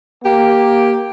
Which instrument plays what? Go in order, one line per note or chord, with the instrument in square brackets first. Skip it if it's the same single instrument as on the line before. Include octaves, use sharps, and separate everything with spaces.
[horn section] A#3 G4